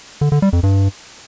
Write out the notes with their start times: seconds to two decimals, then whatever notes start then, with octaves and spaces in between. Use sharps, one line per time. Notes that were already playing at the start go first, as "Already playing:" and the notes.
0.21 D3
0.32 D3
0.42 G3
0.53 F2
0.63 G2